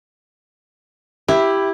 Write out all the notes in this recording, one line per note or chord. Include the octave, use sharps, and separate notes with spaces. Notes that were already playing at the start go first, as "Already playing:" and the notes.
E4 G4